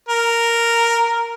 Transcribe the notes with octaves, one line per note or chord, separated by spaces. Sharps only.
A#4